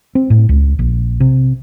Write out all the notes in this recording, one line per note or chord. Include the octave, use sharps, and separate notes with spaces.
C4
A2
C#2
A#1
C3